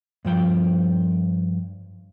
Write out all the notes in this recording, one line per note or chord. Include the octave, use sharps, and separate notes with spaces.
G2 F3 G5